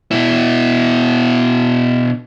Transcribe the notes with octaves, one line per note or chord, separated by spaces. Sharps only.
B2 E4